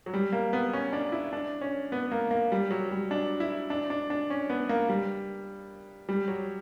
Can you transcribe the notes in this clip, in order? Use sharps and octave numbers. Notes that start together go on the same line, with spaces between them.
F#3
G3
A#3
B3
C#4
D4
E4
D4
C#4
B3
A#3
A#3
G3
F#3
G3
D4
E4
D4
D4
D4
C#4
B3
A#3
G3
G3
F#3